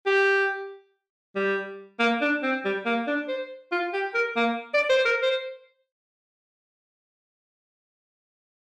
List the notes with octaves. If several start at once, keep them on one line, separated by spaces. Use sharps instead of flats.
G4
G3
A#3
D4
C4
G3
A#3
D4
C5
F4
G4
A#4
A#3
D5
C5
A#4
C5